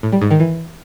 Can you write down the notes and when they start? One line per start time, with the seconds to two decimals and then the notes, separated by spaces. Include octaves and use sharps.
0.03 A2
0.12 G3
0.21 G#2
0.31 D#3
0.40 E3